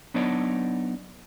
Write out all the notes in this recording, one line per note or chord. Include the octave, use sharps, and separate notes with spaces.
F#3 B3 D4 D#4 C#5 D5